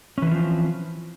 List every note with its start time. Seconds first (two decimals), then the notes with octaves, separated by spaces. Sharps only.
0.18 C#4
0.22 E3
0.27 D3
0.31 F3
0.36 C4